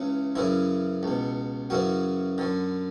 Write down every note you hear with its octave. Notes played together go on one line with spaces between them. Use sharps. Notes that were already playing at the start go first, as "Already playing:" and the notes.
Already playing: C#2 C#3 E3
F#2 C#3 E3 E4
C#2 B2
F#2 C#3 E3 F#4
F#2 D3